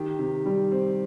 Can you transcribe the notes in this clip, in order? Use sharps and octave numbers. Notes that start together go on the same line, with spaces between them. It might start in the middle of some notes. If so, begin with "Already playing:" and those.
Already playing: D#3 G4
C3
G3
C4